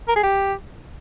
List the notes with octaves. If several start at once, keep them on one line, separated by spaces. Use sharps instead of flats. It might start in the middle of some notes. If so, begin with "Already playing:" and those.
A#4
G#4
G4